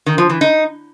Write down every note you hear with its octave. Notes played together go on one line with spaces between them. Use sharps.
D#3
F3
E3
D#4